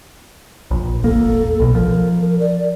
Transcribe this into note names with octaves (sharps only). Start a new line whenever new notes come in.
A#1
D#1 G#1 A#3 A4
B1 B2
F3 A#4
D5